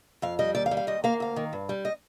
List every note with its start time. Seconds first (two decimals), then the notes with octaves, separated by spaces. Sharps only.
0.22 F2 F5
0.39 G3 D#5
0.55 D#2 D5
0.66 F5
0.71 G3
0.77 F5
0.87 D#2 D#5
1.04 A#3 F5
1.20 D2 F5
1.36 D#3
1.53 G2
1.69 G3
1.85 D#5